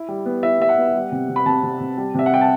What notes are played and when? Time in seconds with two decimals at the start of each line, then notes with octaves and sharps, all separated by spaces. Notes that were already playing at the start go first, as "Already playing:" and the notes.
Already playing: E4
0.08 G3
0.26 B3
0.43 E4 E5
0.59 B3 E5
0.69 F#5
0.77 B3
0.94 G3
1.12 C3
1.29 C3
1.36 B5
1.46 C3 A5
1.63 C3
1.80 C3
1.98 G3
2.14 C3 E5
2.26 F#5
2.31 G3 G5
2.41 A5